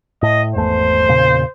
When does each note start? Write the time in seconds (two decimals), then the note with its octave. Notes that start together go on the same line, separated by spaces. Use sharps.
0.23 A2 D#5
0.55 G#1 E2 A3 C5
1.08 E2 A#2 C#3